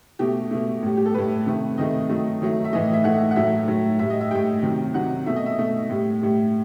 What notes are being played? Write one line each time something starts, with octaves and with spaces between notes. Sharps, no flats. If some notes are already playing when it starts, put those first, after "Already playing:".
B2 A3 G4
B2 A3
A2 G3
G4
A4
A2 G3 B4
C3 D#3 A3
C3 D#3 A3 D#5
D#3 F#3 A3
D#3 F#3 A3
E5
A2 E3 A3 D#5
E5
A2 E3 A3 F#5
F#5
A2 F#3 A3 E5
A2 F#3 A3
A2 G3 E5
D#5
E5
A2 G3 G5
C3 D#3 F#3
C3 D#3 F#3 F#5
B2 A3 E5
D#5
E5
B2 A3
A2 G3
A2 G3